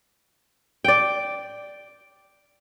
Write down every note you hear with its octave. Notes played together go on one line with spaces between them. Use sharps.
D5 G5